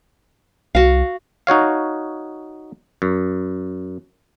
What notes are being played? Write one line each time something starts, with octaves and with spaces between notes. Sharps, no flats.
C2 F#4 F5
D#4 F#4 C#5 F5
F#2